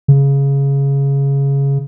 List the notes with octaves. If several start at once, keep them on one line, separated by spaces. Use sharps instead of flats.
C#3